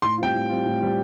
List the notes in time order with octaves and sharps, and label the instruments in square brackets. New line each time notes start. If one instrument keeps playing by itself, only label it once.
[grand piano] A2 [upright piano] C6
[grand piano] G3 C4 F4 [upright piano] G5
[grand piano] A2
G3 C4 F4
A2
G3 C4 F4